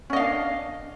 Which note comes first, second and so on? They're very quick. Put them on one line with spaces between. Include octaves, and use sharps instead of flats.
C#4 D#5 F5 D4